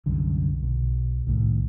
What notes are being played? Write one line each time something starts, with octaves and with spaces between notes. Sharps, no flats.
C2 F#2 D3
B1
C2 A2 D#3